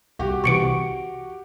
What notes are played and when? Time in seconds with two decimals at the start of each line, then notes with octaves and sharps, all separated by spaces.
0.19 C2 F#4 G4
0.44 C2 C3 E3 C#6 C#7 D7